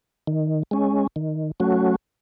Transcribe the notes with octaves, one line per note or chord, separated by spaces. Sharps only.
D#3
G#3 C#4
D#3
F#3 A3 C#4 F#4